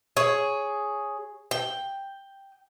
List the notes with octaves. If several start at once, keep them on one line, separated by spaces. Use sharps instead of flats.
G#4 C#5
G5